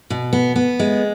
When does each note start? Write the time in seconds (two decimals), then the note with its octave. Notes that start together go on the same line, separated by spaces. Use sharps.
0.10 B2
0.33 B3
0.56 B3
0.80 G#3